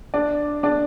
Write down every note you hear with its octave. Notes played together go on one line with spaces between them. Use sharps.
D4 D5
D4 D5